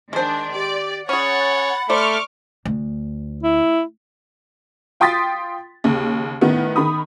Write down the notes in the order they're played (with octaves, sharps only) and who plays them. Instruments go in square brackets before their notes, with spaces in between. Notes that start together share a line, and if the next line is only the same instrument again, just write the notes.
[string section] D#3 D4 [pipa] G#3 C5
[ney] G4 [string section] D5
[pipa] C#4 G#4 [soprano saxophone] C#5 [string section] F#5 A6 [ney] B5
[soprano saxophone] A3 [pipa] C5 D5 [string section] C#6 D6 F6
[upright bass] D2
[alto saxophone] E4
[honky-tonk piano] F4 G5 C6 D#6 A6 B6
D#2 C#3
A2 D#3 B3
D#3 B5 D#6